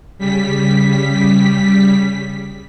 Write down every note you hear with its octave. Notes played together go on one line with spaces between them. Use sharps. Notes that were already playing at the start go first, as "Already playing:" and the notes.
C#3 G3 B6